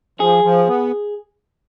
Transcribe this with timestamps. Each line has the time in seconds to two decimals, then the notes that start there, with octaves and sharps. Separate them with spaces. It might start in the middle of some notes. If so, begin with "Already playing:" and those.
0.20 F3 G#4
0.44 F3
0.68 B3